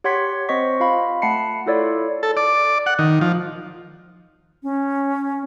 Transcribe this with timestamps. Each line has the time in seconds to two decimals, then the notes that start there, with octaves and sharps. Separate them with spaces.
0.04 G4 C#5 F#5 C6 G#6 B6
0.49 C4 C5 D#5 C#6 B6
0.80 F4 F5 B5
1.22 A3 F#5 A5 B5 C7 C#7
1.66 E4 F4 A4 C#5 D5
2.23 A4
2.37 D5
2.86 F#5
2.99 D#3
3.21 F3
4.63 C#4